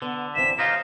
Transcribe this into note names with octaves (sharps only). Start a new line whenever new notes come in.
D3 B3
G2 E3 C4 B6 E7
D#2 A#3 D#4 F4 F5 A#6